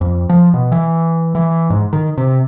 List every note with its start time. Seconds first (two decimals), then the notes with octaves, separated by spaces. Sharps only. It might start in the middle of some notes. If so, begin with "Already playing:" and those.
0.01 F2
0.29 F3
0.54 B2
0.72 E3
1.35 E3
1.70 G#2
1.93 D#3
2.18 C3